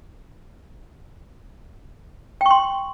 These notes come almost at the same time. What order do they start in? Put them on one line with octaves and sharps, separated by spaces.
G5 C#6 C6